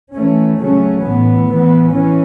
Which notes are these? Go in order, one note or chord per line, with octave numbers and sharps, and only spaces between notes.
E3 A3 C#4
C#3 F#3 A3 C#4
A2 E3 B3
E3 B3
E3 C#4